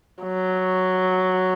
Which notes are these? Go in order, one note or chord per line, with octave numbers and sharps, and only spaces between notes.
F#3